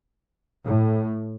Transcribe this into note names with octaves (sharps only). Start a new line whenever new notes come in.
A2